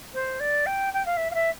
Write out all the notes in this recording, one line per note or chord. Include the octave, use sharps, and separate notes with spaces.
C5
D5
G5
G5
F5
E5
F5
E5